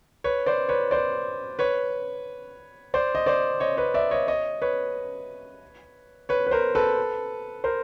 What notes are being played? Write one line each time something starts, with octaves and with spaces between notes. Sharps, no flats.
B4 C#5
C5 D5
B4 C#5
C5 D5
B4 C#5
C5 D5
D#5
C5 D5
C#5 D#5
B4 C#5
D5 E5
C#5 D#5
C#5 D#5
B4 C#5
B4 C#5
B4
A#4 C5
A4 B4
A#4 C5